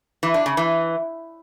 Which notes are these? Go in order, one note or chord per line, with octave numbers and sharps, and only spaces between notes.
E3
D4
C#3
E3